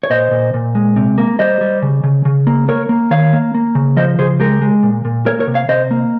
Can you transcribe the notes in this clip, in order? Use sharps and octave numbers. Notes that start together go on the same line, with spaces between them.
C#5
A#2 C5 D#5
A#2
A#2
G#3
C3
A#3
G3 C5 D#5
G3
C#3
C#3
C#3
A#3
A#3 A#4 C#5
A#3
D#3 C#5 F5
A#3
A#3
C#3
F3 C5 D#5
C#3 G#4 C5
G#3 G4 A#4
G#3
A#2
A#2
A#3 A#4 C#5
A#4 C#5
C3
C#5 F5
C3 C5 D#5
A#3